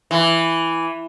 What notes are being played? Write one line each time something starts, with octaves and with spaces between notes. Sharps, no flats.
E3